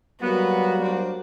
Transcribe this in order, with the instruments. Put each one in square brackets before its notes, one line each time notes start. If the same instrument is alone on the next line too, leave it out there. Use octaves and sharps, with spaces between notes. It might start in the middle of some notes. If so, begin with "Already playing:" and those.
[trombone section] F#3 G3 A#3 [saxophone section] B3 [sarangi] F#4
[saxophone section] D4 C5